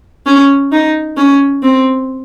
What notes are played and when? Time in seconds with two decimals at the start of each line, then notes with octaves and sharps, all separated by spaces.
0.26 C#4
0.72 D#4
1.18 C#4
1.63 C4